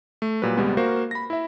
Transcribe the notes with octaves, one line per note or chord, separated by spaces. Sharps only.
A3
A#2 F#3 G3 B4
D2 C3 G3 G#3 B3
A#3 F#4 A#4 C5 F5
B5 A#6
E4 E5